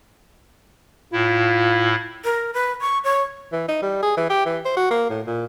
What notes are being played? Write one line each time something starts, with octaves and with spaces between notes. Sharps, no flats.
A2 E4 F4
A#4
B4
C#6
C#5
E3
D#4
G3
G#4
E3
G4
E3
C5
F#4
A#3
A2
A#2